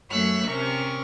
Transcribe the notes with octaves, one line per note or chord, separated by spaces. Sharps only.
F#2 A3 C#5 E5 E6 F#6
C3 C#4 A#4 C#6